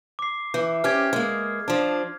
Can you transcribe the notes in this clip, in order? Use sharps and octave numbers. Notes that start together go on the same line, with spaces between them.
D6 C7
E3 G6
C4 C#4 G4 F6 G#6
G#3 A#3
F3 D4